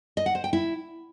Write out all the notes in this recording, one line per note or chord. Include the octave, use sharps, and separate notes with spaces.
D#5
F#5
C5
G5
E4